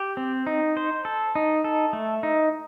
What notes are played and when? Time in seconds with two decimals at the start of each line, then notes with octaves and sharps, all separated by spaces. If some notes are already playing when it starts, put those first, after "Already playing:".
Already playing: G4
0.17 C4
0.47 D#4
0.77 C5
1.05 A4
1.35 D#4
1.64 A4
1.93 A3
2.23 D#4